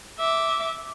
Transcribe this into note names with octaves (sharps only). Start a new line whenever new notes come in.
E5 D6